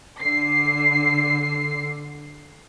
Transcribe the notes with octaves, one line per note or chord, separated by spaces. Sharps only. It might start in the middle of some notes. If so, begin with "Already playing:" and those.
D3 C7